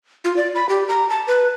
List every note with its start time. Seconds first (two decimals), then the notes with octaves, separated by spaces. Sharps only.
0.25 F4
0.37 D5
0.55 B5
0.69 G4
0.89 A#5
1.10 A5
1.27 B4